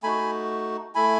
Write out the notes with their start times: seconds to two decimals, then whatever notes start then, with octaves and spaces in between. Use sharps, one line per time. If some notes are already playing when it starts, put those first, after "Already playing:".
0.03 A3 D#4 F#4 G#5 B5
0.95 A3 E4 G#5 B5